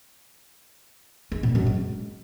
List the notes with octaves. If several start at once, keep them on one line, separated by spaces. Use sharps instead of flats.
G#3
A#2
F#2
G#3